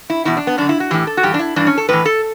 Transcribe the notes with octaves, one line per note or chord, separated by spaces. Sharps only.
E4
E2 B2 E4
D4
B3
F#2 D3 D4
E4
F#4
A2 E3 G4
A4
F#4
G2 E3 G4
D4
E4
G2 E3 D4
C#4
A4
A2 E3 B4
A4